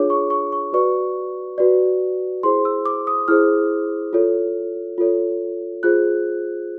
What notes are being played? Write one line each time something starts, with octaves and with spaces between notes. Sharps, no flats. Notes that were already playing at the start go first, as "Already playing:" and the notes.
Already playing: D4 F4 G#4 C#5 D6
C#6
C#6
C#6
F#4 B4 D5 C#6
F#4 B4 D5
E4 G#4 C5 C6
E6
D6
D#6
E4 G#4 C5 F6
F4 A4 C#5
F4 A4 C#5
F4 G#4 C5 F#6